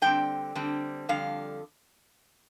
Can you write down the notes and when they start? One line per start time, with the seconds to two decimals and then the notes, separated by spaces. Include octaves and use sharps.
0.02 D3 G3 C4 G5
0.55 D3 G3 C4
1.09 F2 D3 G3 F5